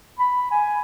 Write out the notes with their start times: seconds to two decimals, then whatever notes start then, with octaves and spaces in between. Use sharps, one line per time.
0.19 B5
0.51 G#5